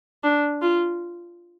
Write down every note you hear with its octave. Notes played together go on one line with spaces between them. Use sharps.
D4
F4